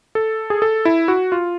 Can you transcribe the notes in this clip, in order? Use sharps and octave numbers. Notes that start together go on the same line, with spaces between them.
A4
G#4
A4
E4
F#4
F4